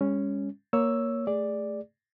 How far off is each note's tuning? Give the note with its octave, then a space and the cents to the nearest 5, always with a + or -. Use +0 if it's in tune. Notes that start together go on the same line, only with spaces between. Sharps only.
G#3 -45 C#4 +0
A#3 +5 C#5 +5 E6 +0
A3 -5 G#4 -20 D5 +0